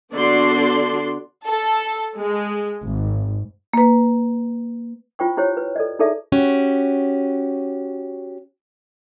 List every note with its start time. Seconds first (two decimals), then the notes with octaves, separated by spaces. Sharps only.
0.13 D3 B3 D4 F#4 D5 C6
1.47 A4
2.17 G#3
2.83 G#1
3.73 A#3 B4
5.19 E4 F4 C5 G5 C#6
5.37 E4 G4 C5 C#5
5.57 B4
5.76 A4 D5 D#5
5.99 D#4 E4 G#4 A4 D5 E5
6.32 C#4 F#4 G4